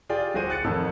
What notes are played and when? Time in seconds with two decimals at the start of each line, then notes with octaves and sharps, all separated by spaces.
0.09 F4 G4 G#4 D5 G5
0.34 D1 F#4 G#4 C5 D#7
0.50 F#6 A6 C#7
0.64 A1 F2 A2 D#3 A5 E6